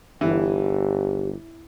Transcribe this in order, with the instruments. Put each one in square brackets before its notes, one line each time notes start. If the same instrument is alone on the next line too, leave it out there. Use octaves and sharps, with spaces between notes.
[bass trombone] G1 [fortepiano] E3 [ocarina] G4